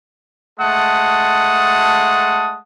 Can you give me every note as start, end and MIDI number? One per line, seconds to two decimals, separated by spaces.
0.59 2.57 56
0.59 2.57 57
0.59 2.57 78
0.59 2.57 81
0.59 2.57 87